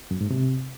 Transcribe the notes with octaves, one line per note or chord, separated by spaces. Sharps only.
F#2
G#2
C3